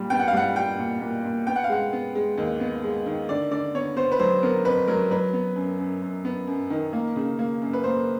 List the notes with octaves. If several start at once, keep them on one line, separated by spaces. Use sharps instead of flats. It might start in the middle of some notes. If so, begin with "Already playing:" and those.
Already playing: A#2 G3
B3 G5
F#5
F5
G3 F#5
G3 G5
A#2
A#2
A#2
B3 G5
F#5
F5
G#3 F#5
B3
G#3
D#2
B3
G#3
D#3
D3 D5
D3 D5
B3 C#5
B3 C5
B4
F#3 C5
B3 A#4
F2 B4
F#3 A#4
F#3 B4
B3
F#2
F#2
F#2
B3
F#2
D#3
A#3
C#3
A#3
F#2
B4
A#3 C5